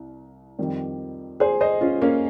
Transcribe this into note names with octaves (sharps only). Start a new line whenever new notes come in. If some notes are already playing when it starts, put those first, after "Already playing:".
Already playing: C2
F2 D#3 G3
G#4 C5
C5 D#5
C#4 F4
A#3 C#4